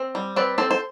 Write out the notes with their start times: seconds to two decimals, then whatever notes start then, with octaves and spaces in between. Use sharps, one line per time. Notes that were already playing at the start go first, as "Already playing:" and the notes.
Already playing: C4
0.15 G3
0.36 C4 B4 D5
0.58 C4 A4 C5
0.71 C5